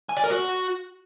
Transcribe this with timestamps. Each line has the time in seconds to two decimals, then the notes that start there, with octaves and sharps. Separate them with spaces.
0.09 G#5
0.17 D5
0.24 A#4
0.31 F#4